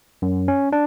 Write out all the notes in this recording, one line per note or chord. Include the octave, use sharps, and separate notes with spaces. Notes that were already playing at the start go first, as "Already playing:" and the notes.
F#2
C#4
D4